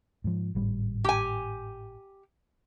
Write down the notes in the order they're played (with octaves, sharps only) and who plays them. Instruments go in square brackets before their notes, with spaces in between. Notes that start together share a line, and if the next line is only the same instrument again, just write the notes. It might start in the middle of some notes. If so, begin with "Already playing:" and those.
[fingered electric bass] G#2 F3
G#1 A2 G3
[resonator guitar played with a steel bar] G4 G#5